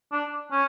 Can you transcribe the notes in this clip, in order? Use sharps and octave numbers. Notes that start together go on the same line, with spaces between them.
D4
C#4